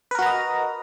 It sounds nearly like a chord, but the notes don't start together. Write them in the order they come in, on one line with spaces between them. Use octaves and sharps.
B4 A#4 F#4 A#5 D#5